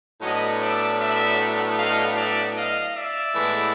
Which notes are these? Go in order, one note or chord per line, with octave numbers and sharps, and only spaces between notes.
A2 F#3 B3 D4 C#5 D#5
D5 E5
D5 E5
D#5 F5
D5 E5
D#5 F5
D5 E5
A2 E3 G#3 B3